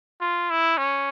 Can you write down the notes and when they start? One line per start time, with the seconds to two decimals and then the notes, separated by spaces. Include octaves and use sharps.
0.21 F4
0.50 E4
0.77 C#4